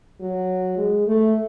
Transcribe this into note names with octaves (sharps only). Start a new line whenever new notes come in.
F#3
G#3
A3